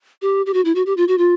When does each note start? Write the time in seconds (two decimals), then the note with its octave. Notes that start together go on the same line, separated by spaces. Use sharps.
0.22 G4
0.46 G4
0.54 F#4
0.65 E4
0.75 F#4
0.86 G4
0.97 F4
1.08 F#4
1.18 F4